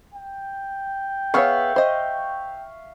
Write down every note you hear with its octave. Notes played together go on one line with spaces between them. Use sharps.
G5
B3 G#4 C#5 E5 F5 C#6
C5 D#5